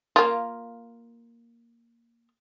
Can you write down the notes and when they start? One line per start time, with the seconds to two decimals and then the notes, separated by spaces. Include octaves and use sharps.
0.16 A#3 F4